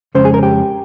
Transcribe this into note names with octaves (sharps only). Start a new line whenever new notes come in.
F2 C#3 G#3 C#4 C5
G#4
A#4
G4